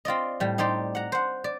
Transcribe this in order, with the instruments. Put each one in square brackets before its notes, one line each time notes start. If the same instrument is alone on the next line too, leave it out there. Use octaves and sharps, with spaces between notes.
[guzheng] C4 F4 D5 D#5
A2 G3
D#4 G4 C5 D5
F#5 A#5
C5 F#5
D5